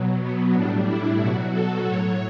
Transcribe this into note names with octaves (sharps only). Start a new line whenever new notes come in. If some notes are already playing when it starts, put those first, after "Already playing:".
Already playing: B2 F#3
B3
A2 G3 D4
E4
B2 F#3 F#4
A4
A2 F#3 C#5